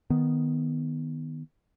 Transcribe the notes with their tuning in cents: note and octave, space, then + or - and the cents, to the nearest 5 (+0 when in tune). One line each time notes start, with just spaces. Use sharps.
D#3 +0 B3 +0